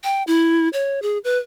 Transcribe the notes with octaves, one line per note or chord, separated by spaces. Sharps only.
G5
E4
C#5
G#4
B4